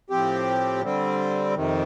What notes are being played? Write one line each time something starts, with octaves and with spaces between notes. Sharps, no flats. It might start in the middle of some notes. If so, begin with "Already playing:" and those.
A2 F3 C4 G4
D3 G3 C4
F2 C3 D#3